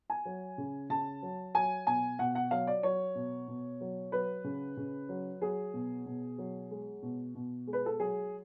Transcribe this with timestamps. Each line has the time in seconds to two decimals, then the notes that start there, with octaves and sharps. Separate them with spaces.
0.10 G#5
0.25 F#3
0.58 C#3
0.90 C#3 A5
1.22 F#3
1.54 F#3 G#5
1.87 B2 G#5
2.19 B2 F#5
2.35 F#5
2.51 F#3 F5
2.67 D5
2.83 F#3 C#5
3.15 B2
3.48 B2
3.81 F#3
4.12 F#3 B4
4.44 C#3
4.77 C#3
5.09 F#3
5.41 F#3 G#4
5.74 B2
6.06 B2
6.38 F#3
6.71 G#3
7.03 B2
7.35 B2
7.67 G#3
7.73 B4
7.86 A4
7.99 F#3 G#4